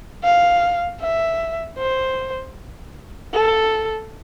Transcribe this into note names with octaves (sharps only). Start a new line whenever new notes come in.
F5
E5
C5
A4